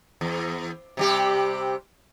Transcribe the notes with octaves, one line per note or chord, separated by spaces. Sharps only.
E2
C3 G3 G4